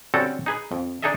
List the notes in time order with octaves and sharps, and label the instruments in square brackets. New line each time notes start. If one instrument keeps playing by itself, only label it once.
[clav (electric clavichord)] D3 G3 C4 C#4 F#4 A4
D#4 G#4 B4
F2
D4 D#4 G#4 A4 D#5 E5